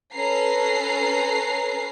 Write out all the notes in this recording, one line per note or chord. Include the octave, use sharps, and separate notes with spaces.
C#4 A4 B4 A#5 C7